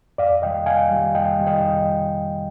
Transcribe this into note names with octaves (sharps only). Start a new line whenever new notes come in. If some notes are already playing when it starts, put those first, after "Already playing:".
F2 D5 F5
C3 D#3 G3 D#5 G5
F2 F5 G#5
C3 D#3 G3
F2 D#5 G5
C3 D#3 G3
D#5 G5
F2